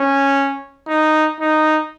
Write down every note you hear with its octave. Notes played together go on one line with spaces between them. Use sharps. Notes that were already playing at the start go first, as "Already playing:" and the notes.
Already playing: C#4
D#4
D#4